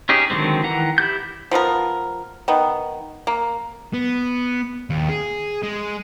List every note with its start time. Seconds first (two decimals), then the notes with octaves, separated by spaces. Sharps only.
0.09 C#4 D#4 G4 G#4
0.30 D3 D#3 F#3 G#3 C4
0.63 D#3 E3 F#5 A#5
0.98 E4 G4 G6
1.51 F3 B3 F4 A#4
2.48 D#3 B3
3.27 A#3
3.94 B3
4.90 D#2
5.09 G#4
5.63 G#3